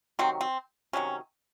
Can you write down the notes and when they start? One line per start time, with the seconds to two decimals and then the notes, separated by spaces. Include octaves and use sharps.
0.19 C3 D#3 F#3 C4
0.41 C4
0.93 C3 D#3 F#3 C#4